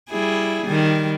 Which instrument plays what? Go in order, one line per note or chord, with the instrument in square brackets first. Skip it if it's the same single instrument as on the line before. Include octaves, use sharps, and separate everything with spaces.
[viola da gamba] G3 E4 G#4
D#3 G3